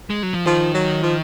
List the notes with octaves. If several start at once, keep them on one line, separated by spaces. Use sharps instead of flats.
G#3
F#3
F3
D#3 F3
F#3
F3